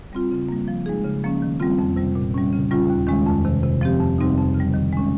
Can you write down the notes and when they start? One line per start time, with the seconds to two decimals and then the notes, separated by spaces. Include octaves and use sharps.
0.13 G3 C4 F4
0.31 C#3
0.49 G3 A#3
0.68 F3
0.86 G#3 D#4 G#4
1.04 C#3
1.24 F3 A#3 C#4
1.42 D#3
1.60 G3 C4 F4
1.79 F2
1.96 C3 G3
2.15 A#2
2.34 G3 C#4
2.53 C#3
2.71 G3 C#4 F4
2.90 D#2
3.07 D#3 G#3 C#4
3.27 F2
3.45 C3 D#3
3.63 C3
3.81 F3 C4 G4
4.00 F2
4.18 C3 G3 C4 D#4
4.37 F2
4.55 C#3
4.60 G3
4.74 D#3
4.93 G#3 C#4